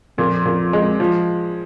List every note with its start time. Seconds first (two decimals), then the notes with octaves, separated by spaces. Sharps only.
0.18 F2 A#2
0.45 A#2
0.73 G#3
1.00 F3